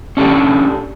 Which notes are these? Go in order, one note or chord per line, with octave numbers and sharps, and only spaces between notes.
C#4 D4 G4 A4